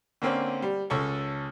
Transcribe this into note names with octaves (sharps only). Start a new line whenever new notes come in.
D3 A#3 C4 C#4
G3
C#2 C#4 A4 C#6